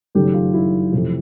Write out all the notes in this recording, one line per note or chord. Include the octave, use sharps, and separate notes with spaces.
F#1 F#2 D#3 F#3 A3 G4
F4
E4
F2 C3 E3 A3